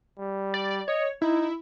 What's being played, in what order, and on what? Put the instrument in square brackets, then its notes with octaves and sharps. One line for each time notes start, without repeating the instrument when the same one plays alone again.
[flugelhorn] G3
[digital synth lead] D5
[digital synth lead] C#5 [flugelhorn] D#5
[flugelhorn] D#4 [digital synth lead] E4